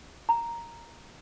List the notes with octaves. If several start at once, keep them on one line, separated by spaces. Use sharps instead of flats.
A#5